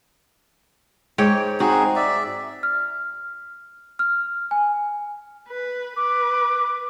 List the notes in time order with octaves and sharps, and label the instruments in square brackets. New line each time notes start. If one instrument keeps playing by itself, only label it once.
[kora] G#2 C#5 G5
[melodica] C4 D#4 G#4 [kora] F#4
[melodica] D5 E5
[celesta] F6
F6
G#5
[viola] B4
[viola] B4 [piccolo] D6